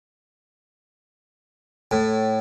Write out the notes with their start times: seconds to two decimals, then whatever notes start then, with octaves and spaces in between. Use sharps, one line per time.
1.91 A2